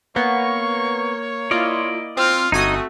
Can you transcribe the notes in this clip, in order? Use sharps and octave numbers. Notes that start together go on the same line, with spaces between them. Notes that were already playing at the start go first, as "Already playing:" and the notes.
A#3 B3 C#5 C#6
A#3 E4 F4 D5 D#5
C4 F4 F6
G1 A3 C4 D#4 F#4 D#5 G#5 D#6